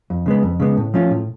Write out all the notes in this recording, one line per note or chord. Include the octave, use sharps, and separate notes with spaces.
F2
C#3 G#3 B3
F2
C#3 G#3 B3
A2
F3 A3 C#4 F4
A2